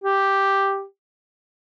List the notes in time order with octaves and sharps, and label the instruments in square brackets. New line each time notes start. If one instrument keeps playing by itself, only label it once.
[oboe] G4